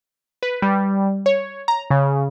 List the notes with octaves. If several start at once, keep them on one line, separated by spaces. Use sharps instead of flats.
B4
G3
C#5
A#5
C#3